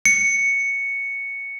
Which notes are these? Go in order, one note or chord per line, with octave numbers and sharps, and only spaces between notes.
C#7